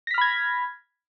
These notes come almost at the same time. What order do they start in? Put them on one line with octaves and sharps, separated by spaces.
A#6 B6 F6 B5 G#6